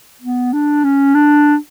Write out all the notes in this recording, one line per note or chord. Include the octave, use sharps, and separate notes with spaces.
B3
D4
C#4
D4